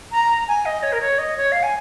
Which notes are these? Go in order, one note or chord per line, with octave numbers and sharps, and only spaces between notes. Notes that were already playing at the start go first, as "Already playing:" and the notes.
A#5
G#5
D#5
C#5
A#4
C#5
D#5
C#5
F5
G#5